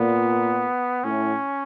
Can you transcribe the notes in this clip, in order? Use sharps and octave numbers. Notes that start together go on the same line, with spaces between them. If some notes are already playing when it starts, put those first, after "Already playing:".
Already playing: A#2 B3
A2 C#4